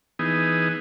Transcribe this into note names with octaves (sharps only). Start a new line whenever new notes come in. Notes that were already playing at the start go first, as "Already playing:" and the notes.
E3 B3 D#4 G#4